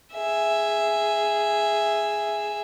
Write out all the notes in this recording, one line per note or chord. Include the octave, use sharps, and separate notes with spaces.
G#4 E5